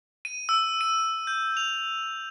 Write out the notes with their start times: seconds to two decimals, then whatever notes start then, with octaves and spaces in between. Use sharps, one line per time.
0.25 D#7
0.49 E6
0.81 D#7
1.27 G6
1.57 F7